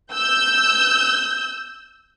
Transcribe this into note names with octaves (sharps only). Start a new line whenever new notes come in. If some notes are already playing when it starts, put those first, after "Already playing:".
E6 G6